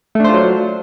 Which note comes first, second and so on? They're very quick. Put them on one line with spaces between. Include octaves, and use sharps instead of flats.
A3 D4 C5 F4 F#3